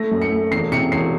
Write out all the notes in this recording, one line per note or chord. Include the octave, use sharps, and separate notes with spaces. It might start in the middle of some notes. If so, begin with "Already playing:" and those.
Already playing: A3 A#6
F#2
C#7
A3
E1 C7
C3 C#7
E1 C7